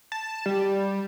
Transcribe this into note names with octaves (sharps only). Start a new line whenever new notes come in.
A5
G3